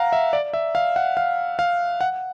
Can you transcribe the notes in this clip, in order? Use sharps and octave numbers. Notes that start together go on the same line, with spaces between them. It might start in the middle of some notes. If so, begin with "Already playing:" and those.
Already playing: F5 F#5 A#5
E5
D5
E5
F5
F#5
F5
F5
F#5